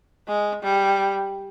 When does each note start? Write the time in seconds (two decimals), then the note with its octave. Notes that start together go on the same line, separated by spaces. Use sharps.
0.28 G#3
0.63 G3